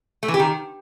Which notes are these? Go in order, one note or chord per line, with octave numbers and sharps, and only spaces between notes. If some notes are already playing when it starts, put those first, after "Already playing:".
A3
E3
G4
D#3